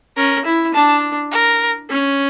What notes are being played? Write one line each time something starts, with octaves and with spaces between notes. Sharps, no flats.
C#4 A#4
E4
D4 A5
A#4
C#4